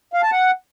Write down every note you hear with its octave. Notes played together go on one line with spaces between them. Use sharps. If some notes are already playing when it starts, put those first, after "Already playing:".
F5
A5
F#5